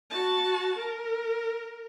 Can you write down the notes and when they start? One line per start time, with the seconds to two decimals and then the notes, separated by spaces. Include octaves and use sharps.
0.10 F#4 A5
0.78 A#4